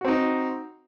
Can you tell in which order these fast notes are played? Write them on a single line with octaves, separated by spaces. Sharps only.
F#4 C4 D#4